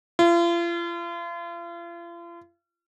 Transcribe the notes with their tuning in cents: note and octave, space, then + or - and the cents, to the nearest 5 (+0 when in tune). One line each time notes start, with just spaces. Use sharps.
F4 -40